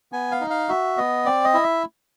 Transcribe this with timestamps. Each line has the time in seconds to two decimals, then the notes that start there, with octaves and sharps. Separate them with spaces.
0.12 B3 G#5
0.32 F5
0.41 D#4
0.50 F5
0.69 F#4 E5
0.97 B3 D#5
1.26 C4 D5
1.44 D#5
1.54 E4
1.63 E5